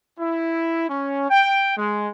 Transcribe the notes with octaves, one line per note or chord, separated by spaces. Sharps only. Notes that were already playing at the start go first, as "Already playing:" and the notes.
E4
C#4
G5
G#3